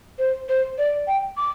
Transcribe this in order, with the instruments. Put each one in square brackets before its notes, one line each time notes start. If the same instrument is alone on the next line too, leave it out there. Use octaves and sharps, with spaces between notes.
[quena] C5
C5
D5
G5
D6